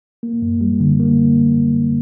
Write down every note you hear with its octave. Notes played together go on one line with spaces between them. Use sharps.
A#3
F#2
G3
D3
A#3